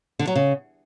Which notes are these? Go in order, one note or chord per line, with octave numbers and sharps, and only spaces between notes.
D3
F#3
C#3